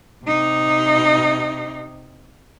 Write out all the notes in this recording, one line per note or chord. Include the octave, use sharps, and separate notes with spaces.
C3 D#4